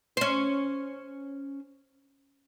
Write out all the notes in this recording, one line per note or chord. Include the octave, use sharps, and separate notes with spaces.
C#4 C5